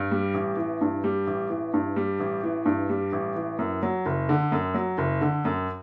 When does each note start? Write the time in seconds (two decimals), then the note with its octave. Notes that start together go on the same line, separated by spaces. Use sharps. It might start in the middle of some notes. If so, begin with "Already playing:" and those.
Already playing: G2
0.11 G3
0.34 A1
0.57 E3
0.81 G2
1.04 G3
1.27 A1
1.50 E3
1.74 G2
1.96 G3
2.20 A1
2.43 E3
2.66 G2
2.89 G3
3.13 A1
3.36 E3
3.59 F#2
3.83 F#3
4.06 F#1
4.29 D3
4.52 F#2
4.74 F#3
4.98 F#1
5.21 D3
5.45 F#2